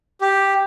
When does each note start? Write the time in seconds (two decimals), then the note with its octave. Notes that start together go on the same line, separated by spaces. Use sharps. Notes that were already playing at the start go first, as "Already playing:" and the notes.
0.21 G4